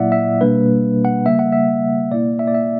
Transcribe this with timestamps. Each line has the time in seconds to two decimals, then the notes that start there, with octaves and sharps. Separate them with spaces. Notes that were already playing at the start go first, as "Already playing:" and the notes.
Already playing: A#2 F#3 A#3 E4 D5 E5 F#5
0.12 E5
0.41 B2 G3 A#3 D4 B4
1.05 F#5
1.26 C#3 G3 A#3 E5
1.39 F#5
1.52 E5
2.11 B2 A#3 E4 D5
2.39 E5
2.47 D5
2.55 E5